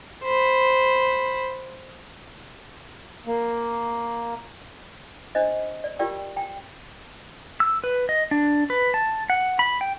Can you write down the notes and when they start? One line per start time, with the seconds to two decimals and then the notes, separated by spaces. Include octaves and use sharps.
0.24 C5 B5
3.27 A#3
5.35 D4 C5 D#5
5.84 D5
5.99 F4 G4 A#4 D5 G5
6.36 G5 G#5 A#5
7.60 E6
7.84 B4
8.09 D#5
8.31 D4
8.70 B4
8.94 A5
9.30 F#5
9.59 B5
9.81 G5